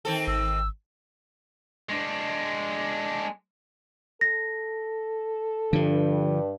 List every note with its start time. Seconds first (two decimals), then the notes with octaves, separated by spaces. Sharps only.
0.05 D#3 C4 A4
0.27 G#1 E6
1.89 G#3 D4
4.21 A4 A#6
5.73 G2 D3 F3